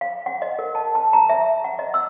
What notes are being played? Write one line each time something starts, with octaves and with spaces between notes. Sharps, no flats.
F5
F#5
D#5
A#4
A5
A5
A#5
E5
F#5
D#5
E6